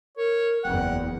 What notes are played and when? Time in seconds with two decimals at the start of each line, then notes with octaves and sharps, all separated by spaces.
0.17 A#4 C#5
0.64 F#1 E2 F#5 G5